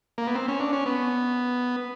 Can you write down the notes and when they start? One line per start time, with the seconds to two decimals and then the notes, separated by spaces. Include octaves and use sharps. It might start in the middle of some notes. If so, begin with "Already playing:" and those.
0.18 A#3
0.27 B3
0.35 C4
0.48 C#4
0.60 D4
0.73 C#4
0.86 B3